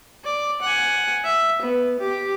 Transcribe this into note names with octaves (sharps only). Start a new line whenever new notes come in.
D5
F#5 G#5
E5
B3
G4